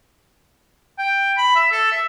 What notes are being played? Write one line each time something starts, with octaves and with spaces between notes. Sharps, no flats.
G5
B5
E5
A4
E5